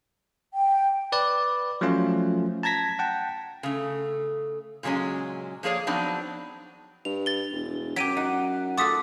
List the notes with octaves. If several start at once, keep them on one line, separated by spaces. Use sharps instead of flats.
G5
B4 D5
F3 F#3 A3 C#4 F4
A5 A#5 G#6 A#6 B6
F#5 G5 A5
C#3 A3
A#2 C#3 F#3 G#3 C#4
F3 A#3 G#4 C#5 D5
F3 F#3 B3 C4 D4 D#4
G2 F7
A6 G7
E1
F#2 F#3 G4 B6 D7 D#7
D#4 F#5
A3 F4 A4 F#5 D6 D#6 B6